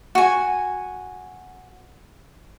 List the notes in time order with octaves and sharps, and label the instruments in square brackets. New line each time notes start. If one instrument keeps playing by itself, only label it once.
[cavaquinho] F#4 G#5